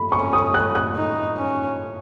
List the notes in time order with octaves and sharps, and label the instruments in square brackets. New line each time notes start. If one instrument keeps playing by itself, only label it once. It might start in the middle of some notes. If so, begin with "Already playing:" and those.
Already playing: [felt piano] B5
[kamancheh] C#4 [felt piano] C#6
[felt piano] D#6
F#6
F#6
[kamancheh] D#4
C#4